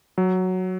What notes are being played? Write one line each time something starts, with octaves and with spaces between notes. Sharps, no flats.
F#3